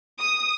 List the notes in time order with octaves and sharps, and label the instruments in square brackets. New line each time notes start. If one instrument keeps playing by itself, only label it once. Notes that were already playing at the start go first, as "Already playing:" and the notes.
[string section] D#6